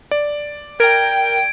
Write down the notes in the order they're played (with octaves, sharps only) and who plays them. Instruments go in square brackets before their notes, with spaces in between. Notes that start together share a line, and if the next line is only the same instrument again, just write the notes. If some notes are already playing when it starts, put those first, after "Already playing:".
[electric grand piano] D5
[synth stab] A#4 [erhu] G5 [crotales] G#6 D7